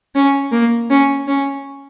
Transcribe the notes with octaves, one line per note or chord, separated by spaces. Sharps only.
C#4
A#3
C#4
C#4